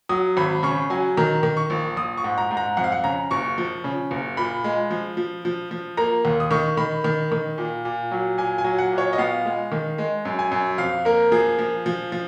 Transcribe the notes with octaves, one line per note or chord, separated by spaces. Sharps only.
F#3 D#6
G#1 B5
C#3 C#6
F#3 G#5
D#3 A#5
D#3
C#6
A#1
A#1 D#6
C#6
G#2
A#5
G#2
A#5
F2 F#5
F5
F#5
C#3 A#5
F#1 C#6
F3
C#3
F#1
A#2 B5
G#3
F3
F3
F3
F3
A#3 A#5
D#2
D#6
D#3 C#6
D#3 B5
D#3
D#3
A#2
A#2
F#3
A#2 G#5
G#5
F#3
F#5
A#2
C#5
D#5
B3 F5
G#3
D#3
G#3
F#2
G#5
F#2
F2 F5
A#3 A#4
F3 G#4
F3
F3
F3